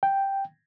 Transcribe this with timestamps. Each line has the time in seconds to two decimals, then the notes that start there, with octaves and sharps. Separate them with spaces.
0.03 G5